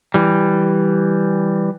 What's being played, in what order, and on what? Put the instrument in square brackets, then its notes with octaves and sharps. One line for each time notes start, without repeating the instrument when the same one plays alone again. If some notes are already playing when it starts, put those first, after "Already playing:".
[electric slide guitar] E3 G3